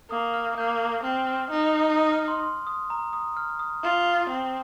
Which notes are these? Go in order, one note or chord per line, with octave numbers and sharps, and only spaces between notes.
A#3 D#6
F6
A#3 G6
C4 F6
F6
D#4
D#6
F6
C6
C6
D#6
A#5
D#6
F6
D#6
F4
C4